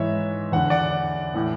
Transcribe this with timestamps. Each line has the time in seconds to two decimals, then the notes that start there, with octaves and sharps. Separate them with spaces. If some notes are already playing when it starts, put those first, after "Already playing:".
Already playing: G#2 E3 C#5 E5
0.52 E2 D3 F#5
0.70 D5 F#5
1.34 A2 E3